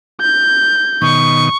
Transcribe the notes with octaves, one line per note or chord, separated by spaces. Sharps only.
G6
B2 D#3 C#6